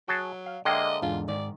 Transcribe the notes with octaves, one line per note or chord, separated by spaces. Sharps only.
F#3 F#4 G#4 A5
F5
D3 G#3 A#3 D#5 E5 G5
E2 G#2 D4 F4
G#2 D#3 D5